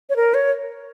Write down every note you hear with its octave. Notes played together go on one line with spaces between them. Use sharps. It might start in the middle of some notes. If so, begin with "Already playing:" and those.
C#5
A#4
C#5